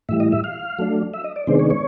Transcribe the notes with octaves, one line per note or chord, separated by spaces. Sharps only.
A2 E3 G3 E5
D#5
E5
F5
F#3 A3 D4
E5
D#5
D5
C3 D#3 G#3 B3 D4 C5
C#5
C#5